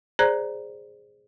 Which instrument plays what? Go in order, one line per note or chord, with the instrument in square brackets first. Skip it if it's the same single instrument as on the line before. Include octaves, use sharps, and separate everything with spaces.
[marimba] G#4 C5 D5 A#5 F#6 G#6